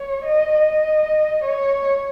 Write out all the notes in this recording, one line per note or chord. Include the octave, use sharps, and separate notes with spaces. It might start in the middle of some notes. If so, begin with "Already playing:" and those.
Already playing: C#5
D#5
D#5
C#5